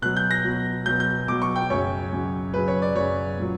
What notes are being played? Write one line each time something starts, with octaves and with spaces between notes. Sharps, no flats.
B2 F#3 F#6
G6
A#6
B2 F#3
B2 F#3 G6
G6
B2 F#3 D6
C#6
G5
F#2 C#3 F#3 C#5
F#2 C#3 F#3
F#2 C#3 F#3 B4
C#5
D5
F#2 C#3 F#3 C#5
A#2 F#3